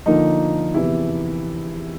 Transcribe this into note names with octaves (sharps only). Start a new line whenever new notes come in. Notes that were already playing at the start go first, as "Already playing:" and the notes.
D3 F3 A#3 D#4
E2 C3 E3 E4